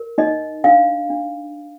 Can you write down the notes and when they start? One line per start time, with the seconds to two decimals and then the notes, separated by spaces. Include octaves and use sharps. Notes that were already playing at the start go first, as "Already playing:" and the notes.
Already playing: A#4
0.18 D#4 D#5
0.64 D4 F5
1.10 D4